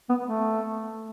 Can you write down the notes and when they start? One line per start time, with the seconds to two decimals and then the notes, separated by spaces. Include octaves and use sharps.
0.09 B3
0.23 A3